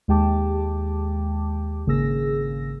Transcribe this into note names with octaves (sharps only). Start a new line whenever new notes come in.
D#2 G#3 G4 G5 A5 D6
G#1 C#3 A#3 G#4 E6 A#6